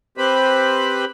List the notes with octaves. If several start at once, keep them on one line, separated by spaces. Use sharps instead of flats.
C4 G4 B4 C5 B5